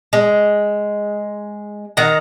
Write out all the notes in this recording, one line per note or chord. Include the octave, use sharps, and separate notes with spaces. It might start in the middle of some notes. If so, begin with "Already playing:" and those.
G#3
D#3 F#5 A#5